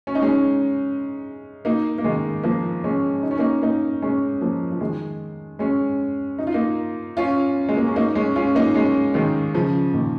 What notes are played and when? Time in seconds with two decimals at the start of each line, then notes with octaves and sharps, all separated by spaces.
0.07 C#4
0.15 D#4
0.22 G#3 C#4
1.65 A#3 D#4
1.98 A#3
2.04 D#3 G#3
2.44 F3 A#3
2.84 G#3 C#4
3.23 D#4
3.31 C#4
3.39 A#3 D#4
3.62 A#3 D#4
4.02 G#3 C#4
4.41 F3 A#3
4.72 F3
4.81 D#3 G#3
5.59 G#3 C#4
6.39 D#4
6.47 F4
6.54 A#3 D#4
7.17 C#4 F4
7.69 G#3
7.77 A#3
7.87 C#4
7.96 A#3 D#4
8.15 G#3 C#4
8.36 C#4 F4
8.55 A#3 D#4
8.75 G#3 C#4
9.14 D#3 G#3
9.54 C#3 F3
9.94 A#2 D#3